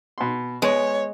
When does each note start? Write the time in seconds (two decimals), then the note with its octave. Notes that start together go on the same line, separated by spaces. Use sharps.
0.18 B2 C6
0.62 G#3 B3 C#5